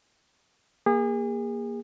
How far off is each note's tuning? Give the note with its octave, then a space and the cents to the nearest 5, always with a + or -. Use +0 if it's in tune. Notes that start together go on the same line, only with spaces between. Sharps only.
A#3 +10 G#4 -35